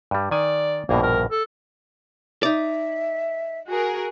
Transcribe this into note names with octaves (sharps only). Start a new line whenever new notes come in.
G2 G3
D#3 D5 G#5
A#1 G2 B2 A#3
A#4
A4
D#4 D5 E5
F#4 G#4 A#4